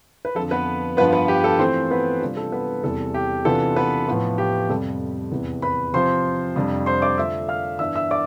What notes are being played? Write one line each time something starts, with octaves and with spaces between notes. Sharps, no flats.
B4
F2 D3 F3 A4
B3 B4
G2 F3 B3 F4 B4
B3 B4
G4
A4
E3 A3 C4 F4 C5
B3 B4
C3 G3 D4 F4 A4
A4
B3 B4
E2 C3 E3 G3 A4
G4
C3 E3 B3 D4 F4 A4
B3 B4
A2 F3 B3 F4
G4
F2 C3 G3 A4
E2 C3 E3 B3
B4 B5
C3 F3 C4 F4 C5 C6
F2 C3 G3 D4
C5 C6
D5 D6
D3 A3 D4 F4 E5 E6
F5 F6
G2 E3 B3 D4 E5 E6
E5 E6
D5 D6